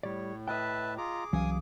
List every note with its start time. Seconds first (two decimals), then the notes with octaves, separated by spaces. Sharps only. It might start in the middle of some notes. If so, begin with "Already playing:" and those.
0.03 A2 G3 C#5 D5
0.48 B4 D#5 E5 G5 A5
0.98 F4 G#4 A#5 D6
1.33 C2 E3 F#3 C#4 F5 G#5 D#6